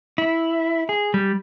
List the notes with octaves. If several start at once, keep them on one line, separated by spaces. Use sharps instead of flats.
E4
G#4
G3